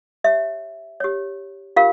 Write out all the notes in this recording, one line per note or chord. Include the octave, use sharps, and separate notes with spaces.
G4 C#5 E5
G4 C#5
F4 G4 A#4 F5